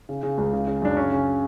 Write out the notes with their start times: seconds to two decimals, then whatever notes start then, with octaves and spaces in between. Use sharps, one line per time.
0.09 C#3
0.23 C#3
0.38 C#2
0.53 C#3
0.67 C#3
0.82 F#2 D4
0.97 C#3 C#4
1.11 C#3